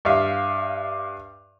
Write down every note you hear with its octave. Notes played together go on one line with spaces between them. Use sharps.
G2 E5 F5